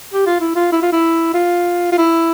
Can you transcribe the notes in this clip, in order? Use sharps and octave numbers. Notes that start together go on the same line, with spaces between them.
G4
F4
E4
F4
E4
F4
E4
F4
F4
E4